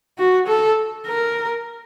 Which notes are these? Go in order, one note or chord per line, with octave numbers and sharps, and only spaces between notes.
F#4
A4
A#4